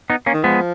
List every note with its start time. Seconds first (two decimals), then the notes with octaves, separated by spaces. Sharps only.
0.10 B3 D#4
0.26 A#3 C#4
0.33 D#3
0.44 F3 G#3 B3